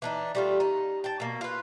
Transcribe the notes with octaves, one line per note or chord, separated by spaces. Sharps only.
E3 D4 D#4
G3 A3 F4
D#4
G5 A5
B2 A#3
F4 B4